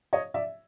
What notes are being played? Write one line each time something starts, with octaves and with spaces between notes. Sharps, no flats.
C#5 D#5
D5 E5